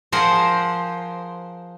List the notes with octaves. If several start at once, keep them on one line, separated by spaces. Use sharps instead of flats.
F3 G#4 A#4 C5 F#5